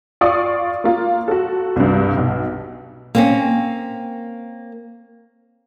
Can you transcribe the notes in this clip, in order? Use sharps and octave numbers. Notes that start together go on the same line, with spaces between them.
F4 D5 F5 C#6 D#6
A#3 F4
F#4 A4
C2 G2
B1
A#3 C4 C#4